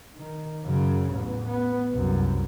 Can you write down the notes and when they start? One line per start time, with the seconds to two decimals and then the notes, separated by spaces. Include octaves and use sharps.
0.16 D#3
0.65 F#2 C#3
1.11 A1 E2
1.48 B3
1.94 C2 F#2